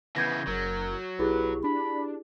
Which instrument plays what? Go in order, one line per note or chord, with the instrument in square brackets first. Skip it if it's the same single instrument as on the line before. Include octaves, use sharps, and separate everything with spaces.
[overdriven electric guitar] C#3 E3 [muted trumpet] B3 [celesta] G6 G#6 A#6
[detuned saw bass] F#1 [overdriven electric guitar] F#3 [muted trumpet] A#4
[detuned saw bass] B1 [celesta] E4 G4 G#4 [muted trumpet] B4
[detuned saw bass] D4 [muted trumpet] B5